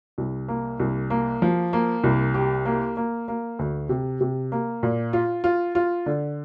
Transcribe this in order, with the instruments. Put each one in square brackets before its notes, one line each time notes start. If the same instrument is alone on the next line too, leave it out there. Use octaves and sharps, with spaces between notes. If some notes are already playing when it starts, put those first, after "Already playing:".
[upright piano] C2
A#3
C2
A#3
F3
A#3
C2
G4
A#3
A#3
A#3
D2
C3
C3
A#3
A#2
F4
F4
F4
D3